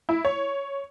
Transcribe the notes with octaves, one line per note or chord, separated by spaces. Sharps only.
E4
C#5